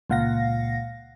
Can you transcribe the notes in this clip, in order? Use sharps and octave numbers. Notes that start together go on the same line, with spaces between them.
C#2 A#2 F5 F#5 A#6